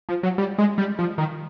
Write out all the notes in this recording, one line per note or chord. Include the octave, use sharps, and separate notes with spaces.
F3
F#3
G3
G#3
G3
F3
D#3